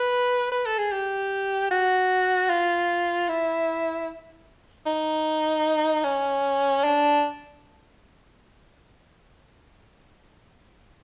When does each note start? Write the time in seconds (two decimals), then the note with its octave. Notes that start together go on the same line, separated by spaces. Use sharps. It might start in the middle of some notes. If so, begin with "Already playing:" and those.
Already playing: B4
0.52 B4
0.66 A4
0.78 G#4
0.92 G4
1.71 F#4
2.50 F4
3.29 E4
4.86 D#4
6.04 C#4
6.84 D4